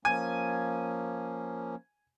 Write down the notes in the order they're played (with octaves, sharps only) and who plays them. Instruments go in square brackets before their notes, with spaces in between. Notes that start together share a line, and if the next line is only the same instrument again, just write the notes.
[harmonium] F3 A#3 C#4 [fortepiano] G#5